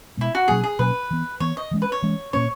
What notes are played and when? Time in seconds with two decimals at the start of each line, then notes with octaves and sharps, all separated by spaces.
0.17 B2 G#3 B3 E4
0.35 F#4
0.48 B2 F#3 A#3 C#4 G#4
0.64 G#4
0.79 B2 F#3 A#3 C#4 B4
1.11 E3 B3
1.40 E3 B3 C#5
1.57 D#5
1.71 E3 G#3 C#4
1.82 B4
1.92 C#5
2.03 E3 G#3 C#4
2.33 A#2 A#3 C#4 C#5